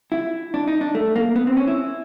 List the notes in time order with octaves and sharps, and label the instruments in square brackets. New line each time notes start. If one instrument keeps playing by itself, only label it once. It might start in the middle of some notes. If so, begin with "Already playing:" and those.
[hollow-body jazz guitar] E4
D4
D#4
D4
A3
A#3
B3
C4
C#4
E4